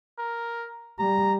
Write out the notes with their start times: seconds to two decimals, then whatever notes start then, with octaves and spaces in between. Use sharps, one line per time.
0.19 A#4
0.99 G3 A#5